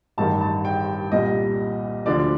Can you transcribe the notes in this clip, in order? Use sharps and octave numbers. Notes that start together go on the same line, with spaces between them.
A1 G2 D#3 A5
A5
G5
C2 A#2 G3 D#5
D2 D3 F3 D5